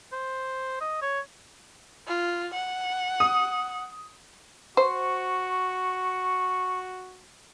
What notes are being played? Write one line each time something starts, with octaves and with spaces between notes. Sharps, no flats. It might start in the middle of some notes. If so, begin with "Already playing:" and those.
C5
D#5
C#5
F4
F#5
D#6
F#4 C5 C#6